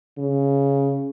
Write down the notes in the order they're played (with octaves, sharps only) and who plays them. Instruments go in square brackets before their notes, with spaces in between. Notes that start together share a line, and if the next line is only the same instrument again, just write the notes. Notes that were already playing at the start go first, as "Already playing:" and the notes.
[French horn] C#3